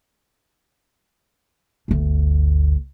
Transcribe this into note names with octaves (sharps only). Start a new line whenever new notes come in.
G1 D2